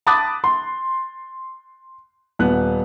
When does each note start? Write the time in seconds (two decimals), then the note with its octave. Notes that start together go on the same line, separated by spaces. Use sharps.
0.07 A5 B5 D6 D#6 F#6 A6
0.44 C6
2.39 D#1 B3 F#6